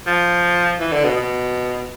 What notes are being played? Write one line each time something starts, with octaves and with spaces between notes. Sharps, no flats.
F3
E3
D3
B2
B2